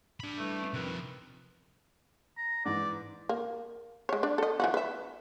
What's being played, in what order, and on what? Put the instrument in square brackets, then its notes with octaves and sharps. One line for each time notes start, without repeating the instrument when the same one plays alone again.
[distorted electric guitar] D4 B5
[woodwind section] E3 G3 A3
[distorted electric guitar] C3 F3 [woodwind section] D#3 C4 B4
[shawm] A#5
[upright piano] G#2 E3 [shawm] D5
[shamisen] A#3
G#3 C#5
D4 D5
A4 D#5
E3 F3 F#4
B4 E5